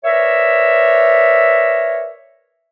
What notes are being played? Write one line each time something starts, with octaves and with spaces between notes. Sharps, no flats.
A#4 B4 C#5 D5 E5